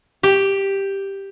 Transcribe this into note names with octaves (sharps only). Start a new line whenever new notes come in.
G4